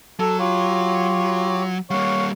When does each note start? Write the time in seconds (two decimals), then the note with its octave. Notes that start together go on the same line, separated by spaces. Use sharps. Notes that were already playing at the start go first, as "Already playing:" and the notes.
0.20 F#3 A4
0.39 F4 G4 C#5
1.90 G3 A#3 C#5 F5 F#5